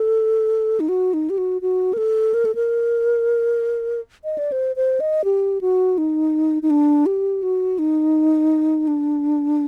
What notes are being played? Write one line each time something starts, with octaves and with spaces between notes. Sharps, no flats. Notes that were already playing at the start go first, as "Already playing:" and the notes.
Already playing: A4
D#4
F#4
D#4
G4
F#4
F#4
A#4
A4
A#4
A4
A#4
D#5
D5
C5
C5
D#5
G4
F#4
D#4
D#4
D4
G4
F#4
D#4
D4